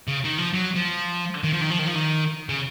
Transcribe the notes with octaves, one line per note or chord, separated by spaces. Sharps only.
C#3
D#3
F3
F#3
F3
D#3
F3
D#3
F3
D#3
F3
D#3
C#3